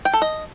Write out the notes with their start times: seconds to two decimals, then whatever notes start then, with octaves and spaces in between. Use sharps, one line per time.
0.05 G5
0.14 A4
0.22 D#5